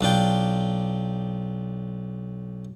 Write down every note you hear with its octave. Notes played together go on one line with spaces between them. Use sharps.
B1 D4 F4 G5